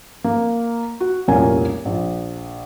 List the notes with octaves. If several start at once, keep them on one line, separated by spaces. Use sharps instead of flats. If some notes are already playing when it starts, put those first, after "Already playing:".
A#3
F#4
F1 C2 A#2 C#4 A#4 G#5
A#1